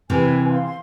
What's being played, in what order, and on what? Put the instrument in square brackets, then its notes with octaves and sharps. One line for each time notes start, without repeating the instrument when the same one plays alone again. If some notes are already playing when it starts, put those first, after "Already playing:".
[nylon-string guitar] C3 E3 A#4 [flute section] B4 G#5
[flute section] F5 C6
C6